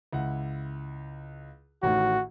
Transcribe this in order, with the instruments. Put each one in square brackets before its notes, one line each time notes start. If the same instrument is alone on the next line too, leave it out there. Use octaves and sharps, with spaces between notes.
[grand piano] C#2 E4 F#5
[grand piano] A1 A2 D#3 [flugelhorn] F#4